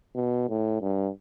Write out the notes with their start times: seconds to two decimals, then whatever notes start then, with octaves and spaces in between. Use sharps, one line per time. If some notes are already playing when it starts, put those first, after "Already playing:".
0.15 B2
0.49 A2
0.81 G2